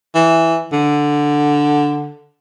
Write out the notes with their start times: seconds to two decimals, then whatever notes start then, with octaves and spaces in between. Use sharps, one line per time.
0.15 E3
0.72 D3